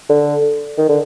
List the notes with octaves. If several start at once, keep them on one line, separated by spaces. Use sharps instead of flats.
D3
D#3
D3